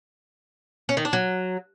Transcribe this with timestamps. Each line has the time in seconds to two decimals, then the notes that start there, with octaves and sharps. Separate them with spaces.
0.89 C#4
0.97 D#3
1.05 D4
1.13 F#3